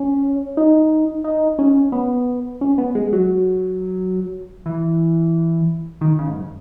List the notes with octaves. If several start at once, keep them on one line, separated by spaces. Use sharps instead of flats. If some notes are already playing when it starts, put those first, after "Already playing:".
Already playing: C#4
D#4
D#4
C#4
B3
C#4
B3
G#3
F#3
E3
D#3
C#3
G#2
F#2